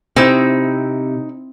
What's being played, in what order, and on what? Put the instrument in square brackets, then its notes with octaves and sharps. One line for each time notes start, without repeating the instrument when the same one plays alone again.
[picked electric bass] C3 [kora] C4 E4 C5 [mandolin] D#4 E6